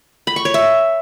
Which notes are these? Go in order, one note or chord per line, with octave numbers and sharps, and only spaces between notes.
B5
C#6
C#5
E5